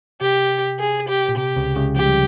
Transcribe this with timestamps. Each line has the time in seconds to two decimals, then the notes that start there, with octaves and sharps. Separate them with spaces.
0.21 C3 G4
0.79 G#4
1.09 G4
1.29 A#2
1.37 C3 G4
1.56 C#2 C#3
1.76 C#2 C#3
1.96 F3 G4
2.06 G3